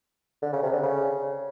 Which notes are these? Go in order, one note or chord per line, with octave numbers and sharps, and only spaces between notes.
D3
C#3
C3
D3
C#3